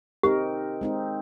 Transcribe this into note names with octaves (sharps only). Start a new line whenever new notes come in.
C4 D#4 G4 A#4
G#3 C4 D#4